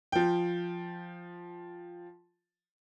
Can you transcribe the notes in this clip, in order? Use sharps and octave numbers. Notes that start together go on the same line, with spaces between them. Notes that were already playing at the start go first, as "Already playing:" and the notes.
F3 G5